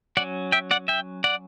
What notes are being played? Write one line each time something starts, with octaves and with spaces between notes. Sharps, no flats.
F#3 C#4 D5 F#5
E5 G5
D5 F#5
E5 G5
D5 F#5